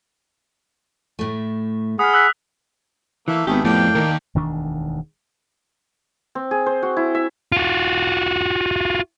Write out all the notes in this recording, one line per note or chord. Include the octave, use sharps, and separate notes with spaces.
A2 A3
G#4 F#5 B5 D#6 F6
E6 F#6 B6
E3 A3 A#3 E5
G#1 D#3 A3 B3 G4 G#4
F2 A2 A#3 D4 G5
D#2 D#3 A#4
E1 D2 D#3 D4
C4
G#4
C5
F#4
E4
E5
F4 F#4